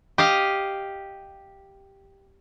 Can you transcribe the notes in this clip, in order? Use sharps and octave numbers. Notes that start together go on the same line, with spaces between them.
G4 D#5 F5